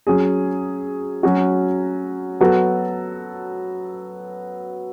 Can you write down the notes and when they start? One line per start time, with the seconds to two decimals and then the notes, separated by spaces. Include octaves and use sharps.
0.07 F#3 C#4 G#4
1.23 F#3 C#4 F#4
2.41 F#3 B3 F#4 A4